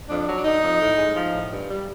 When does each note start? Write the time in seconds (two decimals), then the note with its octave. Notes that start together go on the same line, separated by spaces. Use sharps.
0.09 F2 D4
0.27 F#3
0.37 D4
0.45 D3 D#4
0.63 F2
0.81 A2
0.98 G#3
1.16 F3
1.34 A2
1.52 G2
1.69 G3